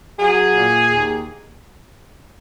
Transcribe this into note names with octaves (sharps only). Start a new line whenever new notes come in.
F#3 G#4
A#2
D#2